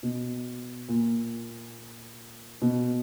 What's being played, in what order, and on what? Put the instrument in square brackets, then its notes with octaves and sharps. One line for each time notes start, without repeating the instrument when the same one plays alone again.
[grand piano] B2
A#2
B2